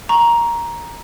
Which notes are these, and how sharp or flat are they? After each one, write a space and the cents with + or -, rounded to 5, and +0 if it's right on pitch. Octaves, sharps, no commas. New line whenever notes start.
A#5 +10 C#6 +0